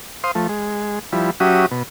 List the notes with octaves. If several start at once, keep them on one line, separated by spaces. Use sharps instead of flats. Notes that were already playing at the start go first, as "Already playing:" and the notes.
C5 F5 C6 D#6
F3 A3
G#3
F3 G3 E4
F#3 C#4 F#4 G4 E5 D#6
B2